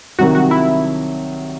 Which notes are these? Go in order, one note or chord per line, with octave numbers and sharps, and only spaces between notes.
C2 C3 D#3 F#3 F#4
F#4
E4